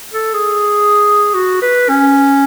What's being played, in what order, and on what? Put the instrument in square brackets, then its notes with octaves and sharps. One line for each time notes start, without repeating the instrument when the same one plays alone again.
[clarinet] A4
G#4
F#4
B4
C#4